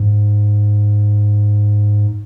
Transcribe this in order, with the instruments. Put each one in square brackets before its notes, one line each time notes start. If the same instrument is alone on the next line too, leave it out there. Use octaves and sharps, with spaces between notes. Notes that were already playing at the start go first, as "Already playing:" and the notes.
Already playing: [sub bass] G#2